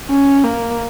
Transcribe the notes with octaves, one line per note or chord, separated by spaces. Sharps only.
C#4
A#3